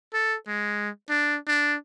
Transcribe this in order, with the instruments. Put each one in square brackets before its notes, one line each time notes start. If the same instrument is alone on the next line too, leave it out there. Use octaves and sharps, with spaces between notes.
[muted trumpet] A4
G#3
D4
D4